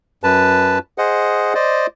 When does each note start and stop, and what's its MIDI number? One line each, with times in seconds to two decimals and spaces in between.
0.24 0.78 42
0.24 0.78 71
0.24 0.78 81
0.98 1.54 68
0.98 1.54 72
0.98 1.54 75
0.98 1.54 78
1.55 1.87 72
1.55 1.87 74
1.55 1.87 75